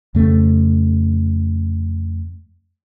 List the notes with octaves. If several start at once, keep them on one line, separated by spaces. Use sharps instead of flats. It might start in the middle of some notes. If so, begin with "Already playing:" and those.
F2 C#3 A3